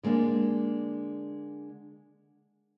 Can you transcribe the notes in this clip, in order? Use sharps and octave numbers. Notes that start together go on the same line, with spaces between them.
D3 G#3 A#3 D4